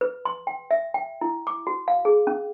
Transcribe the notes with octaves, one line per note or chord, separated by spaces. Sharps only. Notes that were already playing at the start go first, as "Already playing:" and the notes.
B4
C6
G5
E5
G5
E4
D6
F#4
F5
G#4
C#4